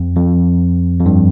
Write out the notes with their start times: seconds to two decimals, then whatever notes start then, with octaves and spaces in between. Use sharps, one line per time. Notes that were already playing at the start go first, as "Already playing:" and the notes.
Already playing: F2
0.17 F2
1.00 F2
1.06 G2